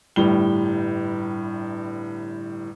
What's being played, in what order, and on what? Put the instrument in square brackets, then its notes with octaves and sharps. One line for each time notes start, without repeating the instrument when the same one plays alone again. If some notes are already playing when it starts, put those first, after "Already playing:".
[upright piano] G1 A2 G3 G7